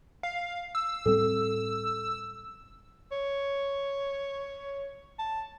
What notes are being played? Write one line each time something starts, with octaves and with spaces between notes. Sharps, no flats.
F5
E6
A2 G3 C4 A4
C#5
A5